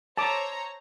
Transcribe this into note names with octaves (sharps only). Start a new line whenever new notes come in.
C5 C#5 A5 A#5 D6